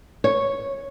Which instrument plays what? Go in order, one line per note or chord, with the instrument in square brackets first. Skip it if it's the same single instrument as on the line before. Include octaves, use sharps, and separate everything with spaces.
[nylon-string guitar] C#5